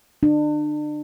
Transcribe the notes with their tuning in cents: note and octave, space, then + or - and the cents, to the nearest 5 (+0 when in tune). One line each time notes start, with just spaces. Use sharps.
D4 +35